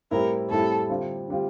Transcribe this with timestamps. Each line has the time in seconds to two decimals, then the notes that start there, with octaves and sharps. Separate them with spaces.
0.11 A2 G3 C4 E4 A#4
0.50 A2 G3 C4 E4 A4
0.90 D3 G3 C4 F4
1.28 D3 G3 C4 F4